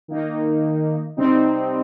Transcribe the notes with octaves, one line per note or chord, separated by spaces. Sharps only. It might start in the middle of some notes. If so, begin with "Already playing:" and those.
D#3 A#3 D#4
C3 G3 C4 D#4